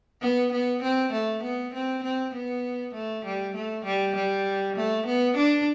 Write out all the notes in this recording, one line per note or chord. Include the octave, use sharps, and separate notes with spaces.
B3
B3
C4
A3
B3
C4
C4
B3
A3
G3
A3
G3
G3
A3
B3
D4